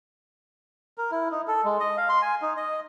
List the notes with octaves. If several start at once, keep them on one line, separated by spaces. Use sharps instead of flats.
A#4
E4
D#4
A4
G#3
D#5
F5
C6
G#5
D#4
D#5